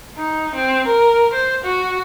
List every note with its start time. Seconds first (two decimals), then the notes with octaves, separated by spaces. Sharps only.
0.17 D#4
0.55 C4
0.86 A#4
1.33 C5
1.64 F#4